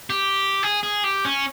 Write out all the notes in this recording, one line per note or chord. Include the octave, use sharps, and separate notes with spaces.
G4
G#4
G#4
G4
C#4